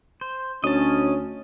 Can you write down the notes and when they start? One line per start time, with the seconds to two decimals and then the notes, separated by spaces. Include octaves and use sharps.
0.21 C5
0.64 D2 C#4 D#5 A5